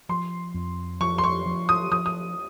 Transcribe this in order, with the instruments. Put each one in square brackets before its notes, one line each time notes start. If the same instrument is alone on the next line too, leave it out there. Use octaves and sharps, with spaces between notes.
[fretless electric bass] F3 [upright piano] C6
[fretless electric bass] F2
[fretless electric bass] F3 [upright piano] C#6
[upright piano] C6
C#6
[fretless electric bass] F3
[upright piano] D#6
[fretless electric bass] F3 [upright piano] D#6
[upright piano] D#6